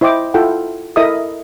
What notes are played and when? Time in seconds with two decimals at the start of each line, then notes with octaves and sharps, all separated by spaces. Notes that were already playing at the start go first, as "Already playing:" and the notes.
0.01 E4 C5 D#5 G5 D6
0.34 E4 F4 A4 F#5 G5
0.96 E4 A4 A#4 D#5 E5 D#6